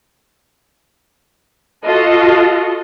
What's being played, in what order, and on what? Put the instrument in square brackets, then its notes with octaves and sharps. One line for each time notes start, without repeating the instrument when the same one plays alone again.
[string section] F4 F#4 A4 D#5